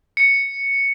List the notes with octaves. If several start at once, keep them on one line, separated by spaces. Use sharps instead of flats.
C#7